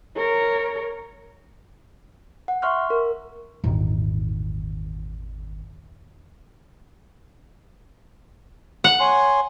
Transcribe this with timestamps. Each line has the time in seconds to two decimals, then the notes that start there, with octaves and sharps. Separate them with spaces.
0.16 A#4 C#5
2.48 F#5
2.62 E5 C6 C#6 F6 F#6
2.90 A#4
3.64 G#1 E2 A#2 D#3
8.84 F#5
9.00 C#5 G#5 C6